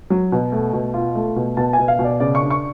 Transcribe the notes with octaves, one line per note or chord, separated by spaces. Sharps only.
F#3
B2
A3
B2
F4
A3
B2
B2 A5
G#5
B2
F5
B2
D5
C#3 D5
C#6
D4
C#6